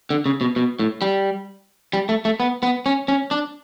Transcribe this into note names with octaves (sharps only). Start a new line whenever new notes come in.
D3
C#3
B2
B2
A2
G3
G3
A3
A3
B3
B3
C#4
C#4
D4